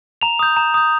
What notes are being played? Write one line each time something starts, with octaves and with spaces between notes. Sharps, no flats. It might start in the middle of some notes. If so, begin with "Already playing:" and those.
A#5 F7
D#6 G6
A#5
D#6 G6